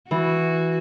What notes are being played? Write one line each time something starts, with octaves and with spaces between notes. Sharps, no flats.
E3 F#4